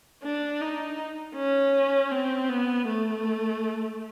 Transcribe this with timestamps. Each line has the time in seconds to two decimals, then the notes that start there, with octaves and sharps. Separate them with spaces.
0.23 D4
0.61 D#4
1.36 C#4
2.12 C4
2.49 B3
2.87 A3